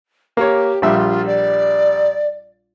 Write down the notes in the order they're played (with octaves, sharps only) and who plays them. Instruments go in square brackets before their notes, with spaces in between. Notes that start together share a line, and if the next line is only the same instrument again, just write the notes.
[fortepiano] A#3 C#5 [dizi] G4
[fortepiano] A#1 G3 E5 [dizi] F4
[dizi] D5